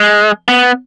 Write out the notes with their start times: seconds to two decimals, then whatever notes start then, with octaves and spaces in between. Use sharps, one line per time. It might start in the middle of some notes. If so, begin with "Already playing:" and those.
Already playing: G#3
0.48 B3